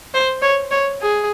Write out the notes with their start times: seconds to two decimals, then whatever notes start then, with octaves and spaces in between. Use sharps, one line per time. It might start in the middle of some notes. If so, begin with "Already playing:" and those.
0.14 C5
0.42 C#5
0.71 C#5
1.01 G#4